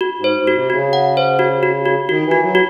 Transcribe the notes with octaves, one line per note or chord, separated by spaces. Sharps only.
F#4
G#2
C5
G#2
F#4
C3
C#3 F#4
F#5
C5
F#4
F#4
F#4
D#3 F#4
E3
F#4
F#3
F#4